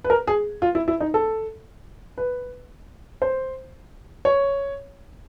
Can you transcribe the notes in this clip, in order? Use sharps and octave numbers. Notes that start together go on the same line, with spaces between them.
B4
A#4
G#4
F4
E4
E4
D#4
A4
B4
C5
C#5